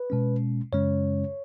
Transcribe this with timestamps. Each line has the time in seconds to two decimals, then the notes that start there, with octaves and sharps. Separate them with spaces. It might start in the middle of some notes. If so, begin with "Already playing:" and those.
Already playing: B4
0.10 B2 G#3 C#4
0.73 F#2 C#3 G#3 C#4 C#5